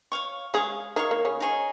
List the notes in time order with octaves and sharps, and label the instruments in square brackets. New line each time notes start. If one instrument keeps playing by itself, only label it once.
[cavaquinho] C#5 F5 C#6
[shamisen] G#3 G#4 [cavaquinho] C#5 F5 C#6
[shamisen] D#3 D#4 [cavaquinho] C#5 F5 C#6
[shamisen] A#3
C#3 C#4
[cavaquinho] D#4 G#4 C#5